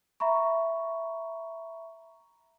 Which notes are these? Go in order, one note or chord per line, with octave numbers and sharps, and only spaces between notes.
E5 A#5 B5 C#6